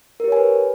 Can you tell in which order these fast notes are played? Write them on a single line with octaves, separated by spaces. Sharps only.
A#4 G4 C#5 G#5 B4